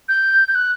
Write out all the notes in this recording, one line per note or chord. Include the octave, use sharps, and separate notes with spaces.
G6
G6
F#6